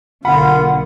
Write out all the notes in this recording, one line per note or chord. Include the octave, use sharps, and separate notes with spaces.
B1 D3 A#3 F4 F#5 B5